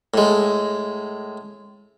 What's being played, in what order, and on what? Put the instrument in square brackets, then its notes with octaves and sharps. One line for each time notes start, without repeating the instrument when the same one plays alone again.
[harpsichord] A2 G#3